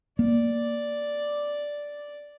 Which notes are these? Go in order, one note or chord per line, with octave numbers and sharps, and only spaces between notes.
A#3 D5